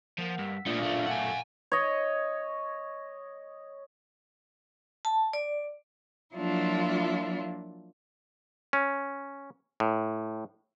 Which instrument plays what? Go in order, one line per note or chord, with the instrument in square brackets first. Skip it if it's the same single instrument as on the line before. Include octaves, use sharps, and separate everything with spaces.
[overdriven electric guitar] F3 [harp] A#3 F#5
[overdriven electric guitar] G2 [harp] E6 B6
[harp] A#2 D#6 A#6 [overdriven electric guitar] A3 A#3 [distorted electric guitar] D4 F4
[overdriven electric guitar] B1 A3 [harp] F5 C#6 D6
[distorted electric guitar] F#5 G#5
[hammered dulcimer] C#5 D#5
[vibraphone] A5
D5
[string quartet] F3 F#3 A#3 D4 E4 F4
[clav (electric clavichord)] C#4
A2